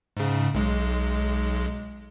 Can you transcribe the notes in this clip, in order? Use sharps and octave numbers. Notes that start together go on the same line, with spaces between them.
G#2 C#3
B1 G#3